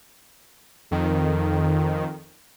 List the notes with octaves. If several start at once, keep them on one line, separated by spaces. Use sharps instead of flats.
F2 D#3